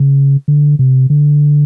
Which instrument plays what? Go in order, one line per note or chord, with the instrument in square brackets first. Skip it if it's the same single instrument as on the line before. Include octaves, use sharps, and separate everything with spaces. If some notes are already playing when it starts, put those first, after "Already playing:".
Already playing: [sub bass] C#3
D3
C3
D3